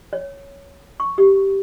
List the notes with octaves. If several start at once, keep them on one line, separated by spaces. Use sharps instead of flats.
C#5
C#6
G4